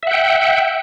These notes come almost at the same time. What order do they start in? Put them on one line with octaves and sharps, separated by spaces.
E5 F#5 G5